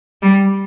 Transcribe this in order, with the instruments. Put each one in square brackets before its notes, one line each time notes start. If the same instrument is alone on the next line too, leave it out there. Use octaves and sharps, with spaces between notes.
[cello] G3